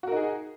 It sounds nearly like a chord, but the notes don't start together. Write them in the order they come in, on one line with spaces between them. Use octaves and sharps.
F#4 A#4 D#4 G#4